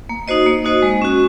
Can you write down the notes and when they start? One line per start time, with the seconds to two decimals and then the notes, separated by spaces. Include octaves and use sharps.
0.09 A#3
0.28 D#4 F#4 C5 D#5
0.46 A#3
0.64 D#4 F#4 C5 D#5
0.82 G#3
1.02 C#4 F#4